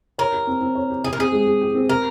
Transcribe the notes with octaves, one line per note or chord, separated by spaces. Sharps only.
A#4 C#5
G4
C4
C4
C#5
G4
G4 G#4
A#4
C4 G#4
G#3
G#3
G4
C4
G4 A#4